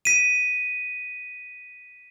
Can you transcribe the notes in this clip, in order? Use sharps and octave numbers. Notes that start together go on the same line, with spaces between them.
B6 D#7